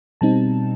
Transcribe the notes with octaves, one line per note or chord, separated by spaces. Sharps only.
B2 G3 C4 D#4 A5